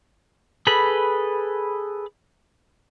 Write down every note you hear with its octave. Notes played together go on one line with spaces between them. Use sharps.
G#4 A4 B4 B5